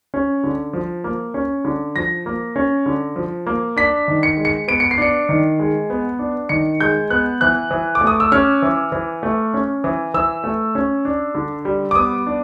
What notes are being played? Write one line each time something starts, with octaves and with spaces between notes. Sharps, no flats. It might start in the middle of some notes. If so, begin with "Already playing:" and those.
C#4
D3
F3
A#3
C#4
D3
F3 A#6
A#3
C#4
D3
F3
A#3
D4 B6
D#3
C#7
G#3
C#7
B3 D7
C#7
C7
D4 C#7
D#3
G#3
B3
D4
D#3 C#7
G#3 G6
B3 F#6
E3 F#6
E3
D6
A3
D#6
E6
C#4 F6
E3
E3
A3
C#4
E3
E3 E6
A3
C#4
D4
D3
G3
D6
B3 D#6
D4